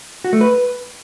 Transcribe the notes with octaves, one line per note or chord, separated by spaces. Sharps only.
F#4
A3
B4